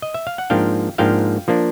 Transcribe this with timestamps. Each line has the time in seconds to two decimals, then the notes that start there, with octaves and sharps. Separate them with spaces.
0.02 D#5
0.14 E5
0.27 F5
0.38 F#5
0.50 G#2 F3 A#3 D4 F5 G5
0.98 G#2 F3 A#3 D4 F5 G5
1.48 F3 A#3 D4